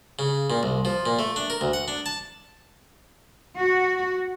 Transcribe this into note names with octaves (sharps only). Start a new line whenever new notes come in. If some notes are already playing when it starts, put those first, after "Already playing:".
C#3
A#2
C2
F3
A#2
A3
D4
A#4
D2
F#5
D4
A5
F#4